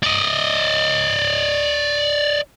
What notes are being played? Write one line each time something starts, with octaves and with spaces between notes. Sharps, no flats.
D5 D#5